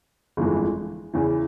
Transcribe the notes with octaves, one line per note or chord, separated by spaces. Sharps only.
G1 F2 E3 G#3
E2 C#3 E3